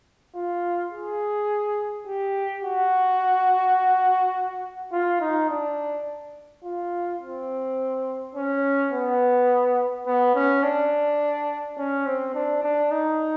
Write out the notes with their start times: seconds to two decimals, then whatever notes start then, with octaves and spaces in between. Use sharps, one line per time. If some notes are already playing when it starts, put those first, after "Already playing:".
0.35 F4
0.92 G#4
2.07 G4
2.64 F#4
4.92 F4
5.21 D#4
5.50 D4
6.64 F4
7.21 C4
8.35 C#4
8.92 B3
10.06 B3
10.35 C#4
10.63 D4
11.78 C#4
12.06 C4
12.35 D4
12.63 D4
12.92 D#4